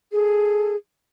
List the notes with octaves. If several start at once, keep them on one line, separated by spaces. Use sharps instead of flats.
G#4 A4